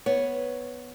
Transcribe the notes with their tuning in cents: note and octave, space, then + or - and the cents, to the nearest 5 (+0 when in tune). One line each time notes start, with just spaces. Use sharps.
B3 +0 C#5 +0